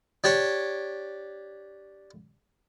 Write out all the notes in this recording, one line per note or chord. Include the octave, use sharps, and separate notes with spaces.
D4 G4 C#5